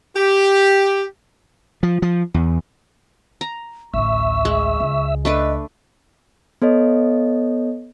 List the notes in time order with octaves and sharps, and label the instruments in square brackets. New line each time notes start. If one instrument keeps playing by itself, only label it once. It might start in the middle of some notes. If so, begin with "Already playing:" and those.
[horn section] G4
[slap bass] F3
F3
E2
[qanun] A#5
[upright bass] A1 D2 [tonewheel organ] E5 E6 [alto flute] C#6
[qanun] G#3
[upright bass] C#2
[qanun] A3 D4 B4 [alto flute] D#5
[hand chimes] B3 A4 C#5 D#5